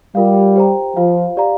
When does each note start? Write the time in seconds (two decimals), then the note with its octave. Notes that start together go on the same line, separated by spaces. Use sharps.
0.15 G3 F4 A#4 F5
0.56 G4 C5 G5 A#5
0.96 F3 F4 C5 F5
1.37 G4 D5 F5 A#5